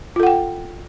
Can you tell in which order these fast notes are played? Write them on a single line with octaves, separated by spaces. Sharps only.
F4 A4 F#5 G5